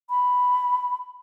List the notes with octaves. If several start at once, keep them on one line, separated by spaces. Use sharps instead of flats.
B5